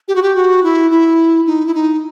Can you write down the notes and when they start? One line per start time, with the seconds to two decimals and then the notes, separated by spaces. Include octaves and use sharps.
0.08 G4
0.15 F#4
0.22 G4
0.36 F#4
0.64 E4
0.91 E4
1.46 D#4
1.66 E4
1.74 D#4